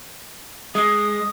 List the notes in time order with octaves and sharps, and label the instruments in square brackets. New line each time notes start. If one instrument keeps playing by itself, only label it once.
[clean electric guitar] G#3 [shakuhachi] D#6